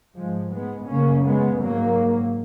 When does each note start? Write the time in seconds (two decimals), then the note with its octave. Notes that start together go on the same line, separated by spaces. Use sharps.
0.16 G#2 F3 G#3
0.52 G#3 B3
0.89 F#2 C#3 A#3 C#4
1.25 G#3 B3
1.61 G#2 F#3 A#3